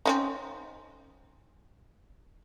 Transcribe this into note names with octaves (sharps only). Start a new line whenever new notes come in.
C4 C#4 D#4